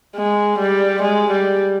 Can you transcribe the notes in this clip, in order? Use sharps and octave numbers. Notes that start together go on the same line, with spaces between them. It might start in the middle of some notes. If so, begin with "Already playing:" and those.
G#3
G3
G#3
G3